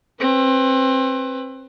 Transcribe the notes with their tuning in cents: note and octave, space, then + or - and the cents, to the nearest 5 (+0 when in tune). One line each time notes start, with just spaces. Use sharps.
C4 +25 B4 +15